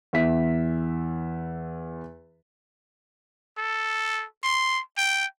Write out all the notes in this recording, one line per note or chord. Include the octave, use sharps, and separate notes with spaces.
E2 E4 E5 B6
A4
C6
G5